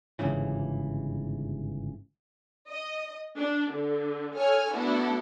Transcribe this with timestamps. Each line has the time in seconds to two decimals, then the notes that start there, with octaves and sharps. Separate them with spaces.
0.19 G1 G#2 C#3 E3
2.67 D#5
3.36 D4
3.70 D3
4.35 A4 C#5 G#5 F6
4.73 A3 B3 D4 E4 F#4 A4